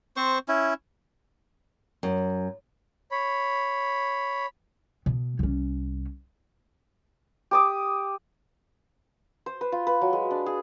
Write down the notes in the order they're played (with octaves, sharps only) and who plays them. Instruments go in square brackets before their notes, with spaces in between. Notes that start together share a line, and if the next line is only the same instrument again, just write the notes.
[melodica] C4 C5 C#6
C#4 E4
[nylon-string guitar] F#2
[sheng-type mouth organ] C#5 B5
[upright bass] B2
C2 C#4
[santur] G4 D6 D#6
C5
B4
F4
B4
F#3
G#3
D4
G#4